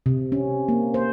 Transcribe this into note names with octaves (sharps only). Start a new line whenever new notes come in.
C3
C#4
A#3
C5